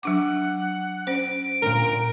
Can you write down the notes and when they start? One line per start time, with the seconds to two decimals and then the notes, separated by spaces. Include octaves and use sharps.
0.03 F#3 D4 F#5 D6
1.07 C#4 C5 D7
1.62 D2 A#2 A#4